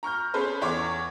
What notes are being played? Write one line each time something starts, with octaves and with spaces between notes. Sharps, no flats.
A#5 C#6 F6 G6
C#4 G#4 A4 B4 C5
E2 C#5 D6